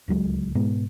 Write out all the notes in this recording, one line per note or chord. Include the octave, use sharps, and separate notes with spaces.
D1 C#2 F#3 G#3
G#2 B2 G#3 B3